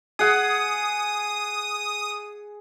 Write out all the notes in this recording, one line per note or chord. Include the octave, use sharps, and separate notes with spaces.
G#4 F#5 D#6